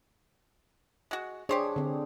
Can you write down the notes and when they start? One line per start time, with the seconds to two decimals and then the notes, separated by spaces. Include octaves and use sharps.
1.11 G#3 F#4
1.49 D4 G4 G#4 C5 C#5
1.76 D3 C4